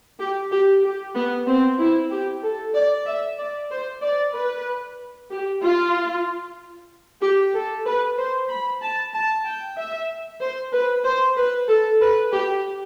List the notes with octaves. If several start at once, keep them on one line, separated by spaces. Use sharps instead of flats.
G4
G4
G4
B3
C4
E4
G4
A4
D5
E5
D5
C5
D5
B4
G4
F4
G4
A4
B4
C5
B5
A5
A5
G5
E5
C5
B4
C5
B4
A4
B4
G4